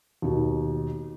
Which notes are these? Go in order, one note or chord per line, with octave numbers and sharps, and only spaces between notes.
D#2 B2